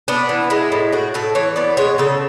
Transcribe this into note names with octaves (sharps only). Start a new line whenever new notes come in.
B3 D4
E3
G#3 E4
A2
A2 F#4
A2 A4
E3 C#5
B3 D5
G#3 C#5
C#3 A4